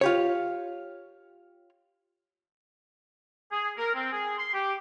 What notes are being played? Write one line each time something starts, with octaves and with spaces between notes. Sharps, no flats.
F4 G4 C#5
G#4
A#4
C4
G#4
C6
G4